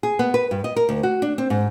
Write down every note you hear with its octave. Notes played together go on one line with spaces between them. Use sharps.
G#4
B3
B4
G2
D#5
A#4
D2
F#4
D4
C4
G#2